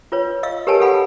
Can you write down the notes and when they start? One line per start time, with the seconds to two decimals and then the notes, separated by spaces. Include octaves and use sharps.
0.12 F4 B4 C#5
0.43 D#5 F5 E6
0.67 G4 A#4 B4 C#5 G#5 A5
0.80 G4 A4 B4 F5 F#5 B5